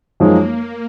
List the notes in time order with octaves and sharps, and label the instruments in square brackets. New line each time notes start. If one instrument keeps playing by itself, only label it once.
[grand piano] F#2 F3 G#3 D#4 [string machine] A#3